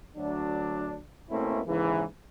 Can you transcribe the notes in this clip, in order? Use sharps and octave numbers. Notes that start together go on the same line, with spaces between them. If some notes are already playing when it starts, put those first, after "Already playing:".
D2 F#3 D4
B2 A3 A#3 C4 C#4 E4
D#2 G#2 C#3 E3